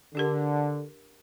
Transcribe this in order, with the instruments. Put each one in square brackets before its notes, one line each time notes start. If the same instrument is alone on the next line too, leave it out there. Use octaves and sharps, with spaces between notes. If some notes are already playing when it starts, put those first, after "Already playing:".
[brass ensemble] D3 [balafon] D4 G4 A#4